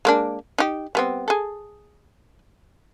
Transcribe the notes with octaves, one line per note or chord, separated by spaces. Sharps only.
G#3 A#3 D4
D#4 G4
G3 B3 C4
G#4 A4